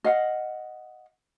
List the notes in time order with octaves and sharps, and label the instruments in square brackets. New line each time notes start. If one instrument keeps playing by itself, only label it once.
[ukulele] D#5 F5 F#5